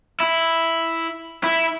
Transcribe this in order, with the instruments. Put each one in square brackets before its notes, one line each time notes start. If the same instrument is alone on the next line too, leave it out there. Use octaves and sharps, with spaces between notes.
[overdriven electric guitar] E4
E4